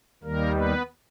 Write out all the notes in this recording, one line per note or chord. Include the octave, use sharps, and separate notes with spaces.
D#2 D#3 G3 A#3 A#4
B3 B4